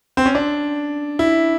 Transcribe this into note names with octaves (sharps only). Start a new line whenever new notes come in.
C4
C#4
D4
E4